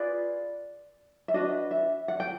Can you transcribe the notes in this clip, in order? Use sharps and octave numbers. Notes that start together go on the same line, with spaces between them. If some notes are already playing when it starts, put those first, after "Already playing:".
Already playing: F4 G#4 B4 D5
E5
D4 F#4 B4 D#5
E5
F#5
G5